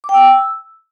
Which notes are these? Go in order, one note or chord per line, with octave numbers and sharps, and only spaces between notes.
D6
G5
E6